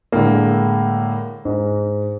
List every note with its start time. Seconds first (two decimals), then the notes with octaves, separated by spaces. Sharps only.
0.12 A2 D3 G#3 A#3
1.45 G#2